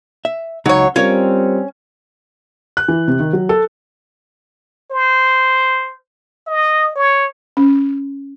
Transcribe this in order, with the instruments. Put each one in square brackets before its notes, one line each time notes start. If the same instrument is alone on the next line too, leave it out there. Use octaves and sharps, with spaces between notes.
[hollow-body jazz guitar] E5
[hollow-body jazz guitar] C#2 D#4 [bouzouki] F#3 C#5
[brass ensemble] G3 C4 [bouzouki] C#4 [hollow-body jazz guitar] F4 A#4 C#5
[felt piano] F#6
E3
C3
D#3
F#3
A4
[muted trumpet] C5
D#5
C#5
[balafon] C#4